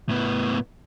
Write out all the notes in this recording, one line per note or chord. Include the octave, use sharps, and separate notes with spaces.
A2 B3